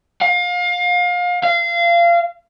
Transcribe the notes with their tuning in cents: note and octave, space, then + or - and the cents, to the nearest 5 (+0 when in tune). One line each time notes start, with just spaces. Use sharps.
F5 +30
F5 -25